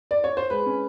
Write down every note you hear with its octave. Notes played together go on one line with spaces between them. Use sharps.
D5
C#5
C5
G#3 B4
C#4